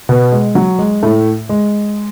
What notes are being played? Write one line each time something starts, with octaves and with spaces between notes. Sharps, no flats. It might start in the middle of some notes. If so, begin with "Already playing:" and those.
B2 B3
G#3
F#3
G#3
A2 A3
G#3